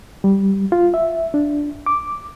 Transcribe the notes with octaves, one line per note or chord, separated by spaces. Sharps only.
G3
F4
E5
D4
D6